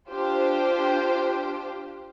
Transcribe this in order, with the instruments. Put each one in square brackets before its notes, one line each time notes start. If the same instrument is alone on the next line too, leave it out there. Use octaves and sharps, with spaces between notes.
[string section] D4 F4 G4 C5